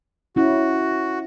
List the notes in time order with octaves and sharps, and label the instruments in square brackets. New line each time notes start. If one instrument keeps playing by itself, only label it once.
[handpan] C#4 E4 [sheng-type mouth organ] F#4